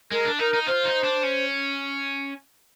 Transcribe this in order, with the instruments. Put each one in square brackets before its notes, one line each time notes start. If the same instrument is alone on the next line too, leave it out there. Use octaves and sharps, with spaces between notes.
[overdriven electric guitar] G#3 [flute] A#4
[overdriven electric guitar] D4
[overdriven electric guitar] D#4 [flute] A#4
[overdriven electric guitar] D#4
[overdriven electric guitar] F4 [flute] C5
[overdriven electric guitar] D#4
D4
C#4